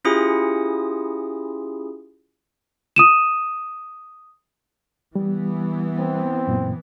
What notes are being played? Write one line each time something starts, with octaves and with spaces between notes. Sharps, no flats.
C#4 E4 F4 G4 G#4 D#6
D#6 D#7 E7
E3 G3 B3
C4
F#2 A#2